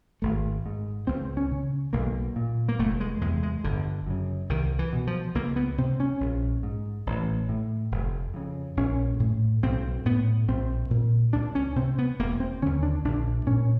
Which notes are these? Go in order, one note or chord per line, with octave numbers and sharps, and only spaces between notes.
G#1 A3
G#2
C#2 C4
C#4
C#3
B1 A#3
A#2
A#3
F1 A3
G#3
E2 C3 G#3
G#3
G1 D3
F#2 C#3
C2 D#3
E3
B2
F3
C#2 A#3
B3
C3 C4
C#4
A#1
G#2
A1
A2
F1
F2 C#3
A#1 C#4
A2
B1 C4
A2 B3
A#1 C4
A#2
C#2 D4
C#4
C3 C4
B3
E1 A#3
C4
D#2 D3 C#4
D4
A#1 D4
A#2 C#4